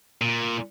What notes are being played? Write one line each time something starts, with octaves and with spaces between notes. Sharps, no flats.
A#2